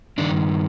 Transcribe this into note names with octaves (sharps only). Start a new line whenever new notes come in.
G2 D#3 D4